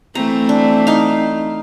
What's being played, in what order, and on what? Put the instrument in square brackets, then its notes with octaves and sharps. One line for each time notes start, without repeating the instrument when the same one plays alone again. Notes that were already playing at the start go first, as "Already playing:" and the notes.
[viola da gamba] E3 A3 C4 [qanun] A#5
[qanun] D4
D#4 F5